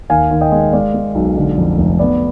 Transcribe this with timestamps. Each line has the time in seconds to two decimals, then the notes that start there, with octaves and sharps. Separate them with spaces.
0.10 D#2 F5 G#5
0.31 D#2
0.41 D#5 G5
0.52 G#3
0.73 G#3 D5 F5
0.94 G#3
1.15 B1
1.36 D3
1.57 F2
1.78 F1
1.99 B3 D5